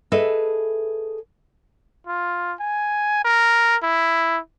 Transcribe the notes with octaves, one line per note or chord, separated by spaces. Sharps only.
G#4 A4 B4 D#5 E5
F4
G#5
A#4
E4